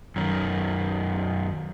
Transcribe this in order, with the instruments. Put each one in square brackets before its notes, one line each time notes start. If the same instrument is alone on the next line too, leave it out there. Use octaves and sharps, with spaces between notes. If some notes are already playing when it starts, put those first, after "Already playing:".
[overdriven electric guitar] F#2 D#3